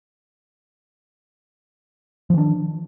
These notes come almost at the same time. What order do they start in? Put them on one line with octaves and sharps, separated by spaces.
F3 D#3 D4